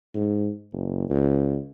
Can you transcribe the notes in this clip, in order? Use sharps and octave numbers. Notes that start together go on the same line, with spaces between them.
G#2
F#1
C#2